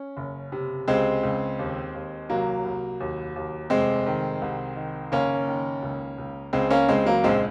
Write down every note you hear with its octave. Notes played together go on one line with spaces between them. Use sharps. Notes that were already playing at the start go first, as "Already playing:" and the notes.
Already playing: C#4
F#1
C3
C#2 G#3 C4
C#2
D#2
D#2
C2 F#3 A#3
C2
D#2
D#2
F1 G#3 C4
D#3
C2
D#3
F#1 A#3 C#4
D#3
C#2
C#2
C#2 G#3 C4
A#3 C#4
C#2 G#3 C4
F#3 A#3
A#1 G#3 C4